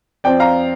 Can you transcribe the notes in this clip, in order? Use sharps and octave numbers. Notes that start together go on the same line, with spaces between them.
F2 F3 C4 D5 G5
F5 A#5